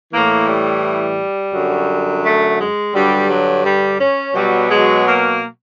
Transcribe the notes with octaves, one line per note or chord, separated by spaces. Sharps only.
A2 E3 A#3
G3
F#2 D3 F#3
A3
G#3
G2 D3 F#3 G3
F#3
G3
C#4
B2 F#3 G3
G#3
A#3